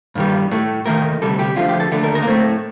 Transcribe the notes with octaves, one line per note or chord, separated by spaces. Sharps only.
G2 D#3 G3
A2 A3
D#2 D#3 A3 A#4
D2 C3 G3 A4
G4
D2 D3 F3 A3 F4
G4
A4
D#2 D3 A3 A4
A#4
A#4
A#3
A2 A3 C4